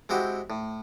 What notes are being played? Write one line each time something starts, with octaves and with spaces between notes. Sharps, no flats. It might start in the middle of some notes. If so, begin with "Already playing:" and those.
G#3 C4 E4 F#4 G4
A2